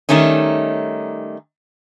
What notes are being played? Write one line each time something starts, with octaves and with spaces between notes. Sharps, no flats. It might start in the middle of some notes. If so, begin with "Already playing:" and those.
D#3 G3 A3 C#4 D#4